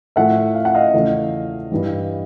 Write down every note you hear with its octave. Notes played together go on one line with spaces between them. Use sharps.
A2 F3 A3 E5 F#5
F5
F#5
D#5 F5
E2 C#3 F3 A3
G2 E3 G3